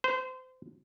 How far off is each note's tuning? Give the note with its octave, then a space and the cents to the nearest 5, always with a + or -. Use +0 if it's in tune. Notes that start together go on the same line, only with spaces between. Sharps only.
C5 -30